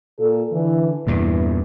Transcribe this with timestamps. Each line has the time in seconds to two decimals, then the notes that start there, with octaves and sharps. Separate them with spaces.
0.19 A#2 F4 A4
0.53 D3 E3
1.07 E2 G2 A#2 E3